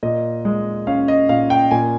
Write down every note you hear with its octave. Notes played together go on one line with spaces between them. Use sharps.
A#2 D#5
G#3
C#4 F5
D#5
A#2 F5
G5
A#2 G#5